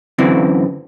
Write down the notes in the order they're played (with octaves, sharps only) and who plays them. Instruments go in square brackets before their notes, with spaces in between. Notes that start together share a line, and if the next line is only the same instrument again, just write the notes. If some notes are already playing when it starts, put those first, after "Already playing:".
[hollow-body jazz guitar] F#2 D3 E3 C4